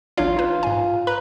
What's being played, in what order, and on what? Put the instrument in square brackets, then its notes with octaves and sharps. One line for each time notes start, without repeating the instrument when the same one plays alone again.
[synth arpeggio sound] A1 D4 C#5 [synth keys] F4
[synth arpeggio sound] D#4 B4
G#2 G#5
[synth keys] B4 [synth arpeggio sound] A#5